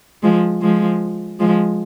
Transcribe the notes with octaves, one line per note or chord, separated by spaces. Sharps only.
F3 G#3
F3 G#3
F3 G#3